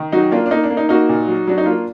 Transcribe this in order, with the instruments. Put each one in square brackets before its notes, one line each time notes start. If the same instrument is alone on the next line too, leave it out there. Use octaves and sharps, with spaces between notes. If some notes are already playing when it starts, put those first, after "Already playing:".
Already playing: [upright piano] D#3
F#3 D#4 F#4
A#3 D4 F4
D4
A#3 D#4
D4
A#3
D#4
A#3 D#4 F#4
A#2
F#3
F#3 D4
D#4
A#3 D4 F4